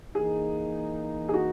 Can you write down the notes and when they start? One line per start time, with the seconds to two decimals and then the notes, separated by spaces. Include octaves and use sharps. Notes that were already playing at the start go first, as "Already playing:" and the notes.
0.15 E3 A#3 D#4 G#4
1.29 G#4
1.34 F#4